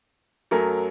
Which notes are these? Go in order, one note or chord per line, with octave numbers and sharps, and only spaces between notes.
F#2 F#3 A3 A#4